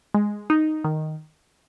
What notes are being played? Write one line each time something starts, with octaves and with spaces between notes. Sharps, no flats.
G#3
D#4
D#3